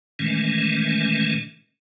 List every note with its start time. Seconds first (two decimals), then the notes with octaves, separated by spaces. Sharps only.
0.19 A#2 D#3 E3 G#3 A3 C#4